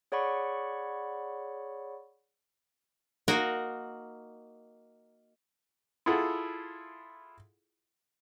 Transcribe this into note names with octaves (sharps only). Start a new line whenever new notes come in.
G#4 C#5 D5 F#5 B5 C#6
A#3 D#4 F#4 A#4
E4 F4 G#4 A4 F#5